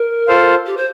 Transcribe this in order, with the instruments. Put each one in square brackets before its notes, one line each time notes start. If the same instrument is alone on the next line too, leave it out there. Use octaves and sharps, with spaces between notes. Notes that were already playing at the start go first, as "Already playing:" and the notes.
Already playing: [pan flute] A#4
[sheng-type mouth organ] F4 A4 C5 F5
[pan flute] G4
C5